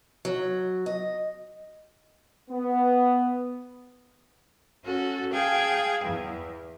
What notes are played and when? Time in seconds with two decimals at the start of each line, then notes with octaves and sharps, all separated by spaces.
0.25 F#3
0.86 D#5
2.51 B3
4.84 C#4 F#4 A4
5.32 G#4 F5 G5 A5 G#6
6.04 E2